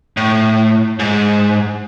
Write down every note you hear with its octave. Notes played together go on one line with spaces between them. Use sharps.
A2
G#2